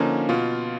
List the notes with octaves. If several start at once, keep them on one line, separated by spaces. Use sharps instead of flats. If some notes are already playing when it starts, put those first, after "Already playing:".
Already playing: D3 F3 A#3 C#4 D#4
B2 F4